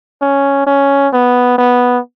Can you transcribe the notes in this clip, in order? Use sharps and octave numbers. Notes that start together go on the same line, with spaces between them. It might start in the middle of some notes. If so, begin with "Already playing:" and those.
C#4
C#4
B3
B3